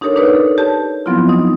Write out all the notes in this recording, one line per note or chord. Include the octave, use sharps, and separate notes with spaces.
D4 D#4 G4 A4 A#4 C#5
D4 D#4 G4 B4 C#5 D5
A4
G4 C#5 A5
F3 F#3 B3 C4 E4 F4
D#4 D#5